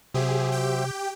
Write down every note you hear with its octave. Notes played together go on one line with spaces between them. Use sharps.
C3 F#3 G4 G#4 C5 E5
G4 G5